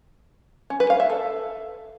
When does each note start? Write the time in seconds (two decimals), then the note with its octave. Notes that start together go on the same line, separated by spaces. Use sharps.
0.70 C#4
0.80 B4
0.90 F5
1.00 E5
1.10 A4